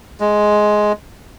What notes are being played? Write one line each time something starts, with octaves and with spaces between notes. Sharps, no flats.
G#3